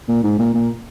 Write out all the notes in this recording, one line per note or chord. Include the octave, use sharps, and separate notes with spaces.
A#2
G#2
A#2
A#2